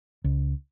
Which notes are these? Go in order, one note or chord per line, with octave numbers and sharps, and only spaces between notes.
C#2